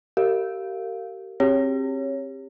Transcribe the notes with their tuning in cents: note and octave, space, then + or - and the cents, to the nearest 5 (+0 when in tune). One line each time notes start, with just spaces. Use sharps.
G4 -30 A#4 -35 F5 +0
C4 +35 G4 +30 C#5 +0